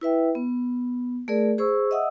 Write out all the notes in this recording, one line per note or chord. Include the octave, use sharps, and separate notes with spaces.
E4 B4 E5 G5
B3
A3 G#4 A#4 D5
G#4 C5 C#6 E6
D#5 E5 F#5 D#6 E6